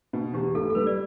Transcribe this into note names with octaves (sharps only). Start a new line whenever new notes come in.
B2
E2 G4
F1 A4
A4
G3 B4
D5